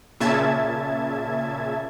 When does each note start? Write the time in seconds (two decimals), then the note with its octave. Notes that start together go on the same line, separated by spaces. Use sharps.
0.20 A#2 C#3 E5 A5 G#6